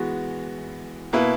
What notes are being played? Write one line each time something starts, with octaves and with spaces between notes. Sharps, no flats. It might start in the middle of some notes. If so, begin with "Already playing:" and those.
Already playing: E3 G#3 B3 F#4
B2 A#3 E4 B4